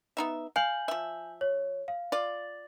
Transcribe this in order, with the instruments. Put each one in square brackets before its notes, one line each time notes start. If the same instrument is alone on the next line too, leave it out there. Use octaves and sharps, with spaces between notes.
[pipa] B3 D#4 E5
[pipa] F5 [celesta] G#5 G6 F#7
[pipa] F3 E5
[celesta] C#5
F5
[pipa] F4 D5